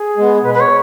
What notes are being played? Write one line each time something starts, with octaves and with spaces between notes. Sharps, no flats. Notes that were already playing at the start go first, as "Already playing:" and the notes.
Already playing: G#4
G#3 B3
B2 B4
B4
C#5